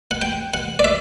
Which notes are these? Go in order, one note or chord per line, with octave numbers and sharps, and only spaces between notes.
F#5
G5
F#5
D5
E5